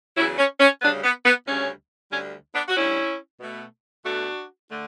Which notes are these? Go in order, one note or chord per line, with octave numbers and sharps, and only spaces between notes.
E2 C#3 F#3 C#4 E4
C#4
C#4
D2 C#3 G3 B3 D4
B3
B3
D2 C#3 G3 C#4
D2 D3 G3 C#4
B3 D4
F#4
D2 D3 G3 C#4 E4
B2 A3
B2 A3 D4 F#4
D3 A3